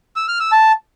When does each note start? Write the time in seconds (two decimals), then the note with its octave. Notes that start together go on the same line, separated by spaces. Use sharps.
0.16 E6
0.28 F6
0.40 E6
0.52 A5